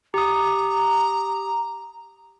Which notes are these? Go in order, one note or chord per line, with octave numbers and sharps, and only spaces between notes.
G4 A#5 D#6